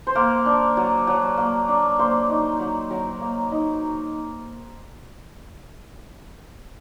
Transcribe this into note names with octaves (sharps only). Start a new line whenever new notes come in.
C5
A#3 A#4
D4
F#3
F#3
A#3
D4
A#3 C5
D#4
F#3
F#3 A#4
A#3
D#4